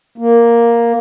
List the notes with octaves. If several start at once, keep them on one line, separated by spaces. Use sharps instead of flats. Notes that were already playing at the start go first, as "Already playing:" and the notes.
A#3